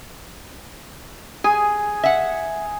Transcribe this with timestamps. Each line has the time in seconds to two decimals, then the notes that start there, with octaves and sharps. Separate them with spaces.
1.44 G#4 G#5
2.04 E5 F#5